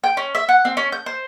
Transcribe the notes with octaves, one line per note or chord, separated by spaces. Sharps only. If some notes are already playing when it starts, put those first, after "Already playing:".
G5
C#4
E5
F#5
C4
C#4
G6
C5